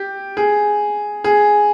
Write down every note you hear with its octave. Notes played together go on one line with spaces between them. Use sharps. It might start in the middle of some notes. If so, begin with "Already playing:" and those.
Already playing: G4
G#4
G#4